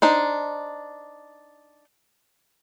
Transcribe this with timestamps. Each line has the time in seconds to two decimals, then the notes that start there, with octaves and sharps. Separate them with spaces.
0.02 D4 D#4 C5